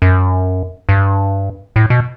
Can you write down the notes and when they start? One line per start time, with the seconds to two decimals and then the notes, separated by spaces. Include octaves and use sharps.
0.02 F#2
0.89 G2
1.76 A2
1.90 B2